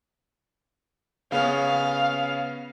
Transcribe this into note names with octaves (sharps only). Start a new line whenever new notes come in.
C#3 B3 C#4 F5